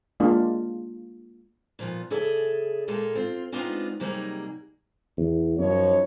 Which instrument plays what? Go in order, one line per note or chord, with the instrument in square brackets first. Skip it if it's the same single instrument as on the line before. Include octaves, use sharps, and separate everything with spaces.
[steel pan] G#3 A#3 D4 F4
[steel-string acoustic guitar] A#2 F3 B3
C#3 G#4 A4 D5 E5 A5
A#2 G#3 A#3 A4
C4 F4
G#3 B3 C4 D4 D#4 F4
C3 F#3 G3 A#3 D#4 G#4
[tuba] E2
[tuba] F#2 [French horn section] F3 D#4 C#5